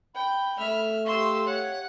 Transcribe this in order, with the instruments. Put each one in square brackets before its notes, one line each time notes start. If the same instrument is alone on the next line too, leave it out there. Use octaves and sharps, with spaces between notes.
[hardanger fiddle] G5 [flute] B5
[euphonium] A3 [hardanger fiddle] E5 [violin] F6
[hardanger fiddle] G4 F5 [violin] C6 E6 [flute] C#6
[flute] C#5 [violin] F#5